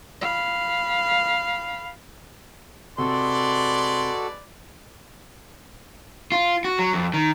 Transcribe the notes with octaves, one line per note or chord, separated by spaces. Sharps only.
F5 B5
C3 G#3 F#4 A4 B4 D5 C6
F4
F#4
F#3
F2
D#3